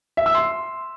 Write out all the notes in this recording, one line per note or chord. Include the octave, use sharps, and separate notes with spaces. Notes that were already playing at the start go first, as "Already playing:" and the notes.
E5
E6
C6